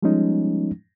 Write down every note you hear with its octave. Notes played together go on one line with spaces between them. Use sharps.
F3 G3 G#3 B3 C#4 D#4